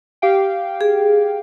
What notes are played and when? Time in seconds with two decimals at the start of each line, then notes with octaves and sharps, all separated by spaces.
0.22 G4 F5 G5
0.81 G#4